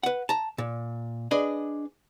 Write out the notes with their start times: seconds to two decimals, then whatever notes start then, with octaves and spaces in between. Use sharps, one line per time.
0.03 B4 F#5
0.29 A5 A#5
0.58 A#2
1.31 D4 G#4 B4 D#5